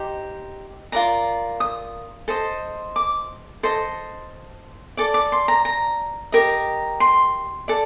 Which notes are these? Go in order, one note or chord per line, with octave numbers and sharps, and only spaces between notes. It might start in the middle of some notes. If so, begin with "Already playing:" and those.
Already playing: D#4 G4 C5
F4 A#4 D5 A#5
D#6
A4 C5 D#5
D6
A4 C5 D#5 C6
A4 D5 D6
D6
C6
A#5
A#5
G4 A#4 D#5
C6
A4 D5